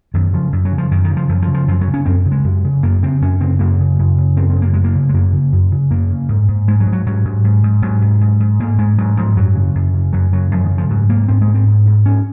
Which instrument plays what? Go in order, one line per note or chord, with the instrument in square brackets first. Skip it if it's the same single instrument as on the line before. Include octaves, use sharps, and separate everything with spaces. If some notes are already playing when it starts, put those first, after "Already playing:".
[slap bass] F#2 D#3
C#3 F3
F#2
F#3
C#3
F3
F#2 D#3
D#3
C#3
F3
F#2 F3
F3
C#3
F3
F#2 F3
F#3
C#3
C#4
F#2 C4
C#3
G#3
F#2
C#3
F#2 A#3
C#3 C4
F#2 C#4
C#3 C4
F#2 A#3
C#3
F#2
C#3
F#2 C4
C4
C#3
A#3
F#2 G#3
A#3
C#3
G#3
F#2 A#3
C#3
F#2
C#3
F#2 A#3
C#3
G#2
G#2
G#2 G#3
F#3
G#2
F#3
G#2 F#3
G#2
G#2
G#2
G#2 F#3
G#2
G#2
G#2
G#2 A#3
G#2 G#3
G#2 F#3
G#2 F3
F#2 F#3
C#3
F#2
C#3
F#2 F#3
C#3 F#3
F#2 F3
D#3
C#3
F3
G#2 F#3
G#2 A#3
G#2 C4
G#3
G#2
C4
G#2
G#2
G#2 C#4